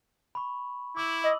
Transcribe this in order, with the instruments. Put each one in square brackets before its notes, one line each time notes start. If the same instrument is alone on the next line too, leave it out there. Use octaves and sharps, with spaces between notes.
[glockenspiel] B5 C#6
[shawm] E4 [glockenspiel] D6 E6 F#7
[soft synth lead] D#5